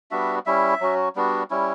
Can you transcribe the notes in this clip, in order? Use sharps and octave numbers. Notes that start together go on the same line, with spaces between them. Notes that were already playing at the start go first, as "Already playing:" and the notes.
G3 B3 D4 F#4 E5
G3 C#4 E4 E5
F#3 C#4 F#4
G3 B3 D4 F#4
G3 C#4 E4